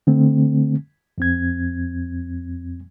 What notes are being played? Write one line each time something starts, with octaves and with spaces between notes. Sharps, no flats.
D3 A3 C4
F2 C4 G#6